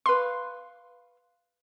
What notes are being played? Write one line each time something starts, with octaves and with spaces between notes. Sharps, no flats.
B4 F5 C6